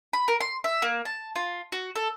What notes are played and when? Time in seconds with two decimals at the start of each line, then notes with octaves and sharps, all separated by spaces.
0.13 B5
0.28 A#4
0.40 C6
0.64 E5
0.82 A#3
1.05 A5
1.36 F4
1.72 F#4
1.96 A4